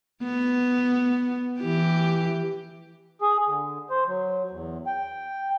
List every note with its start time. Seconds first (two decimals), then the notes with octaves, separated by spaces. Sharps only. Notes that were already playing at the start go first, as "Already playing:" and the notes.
0.23 B3
1.60 E3 G4
3.21 G#4
3.47 D3
3.90 C5
4.07 F#3
4.51 E2
4.87 G5